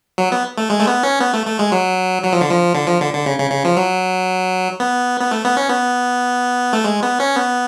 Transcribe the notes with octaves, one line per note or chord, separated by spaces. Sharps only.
F#3
B3
A3
G#3
A3
B3
C#4
B3
A3
A3
G#3
F#3
F#3
F3
D3
F3
D3
F3
D3
D3
C#3
C#3
C#3
F3
F#3
B3
B3
A3
B3
C#4
B3
A3
G#3
B3
C#4
B3